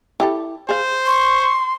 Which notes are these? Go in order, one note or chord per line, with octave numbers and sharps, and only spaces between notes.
E4 G4 A4
G#4 C5 F5
C6 C#6